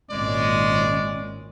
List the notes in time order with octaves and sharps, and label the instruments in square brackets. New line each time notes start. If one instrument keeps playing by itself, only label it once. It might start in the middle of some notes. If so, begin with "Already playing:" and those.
[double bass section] G#1 A#2 C#4 [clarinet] G#3 [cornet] D5